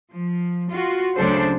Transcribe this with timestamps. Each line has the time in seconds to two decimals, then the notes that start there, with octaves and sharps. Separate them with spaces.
0.12 F3
0.72 F4 F#4
1.17 D2 C#3 F#3 D4 A4 C5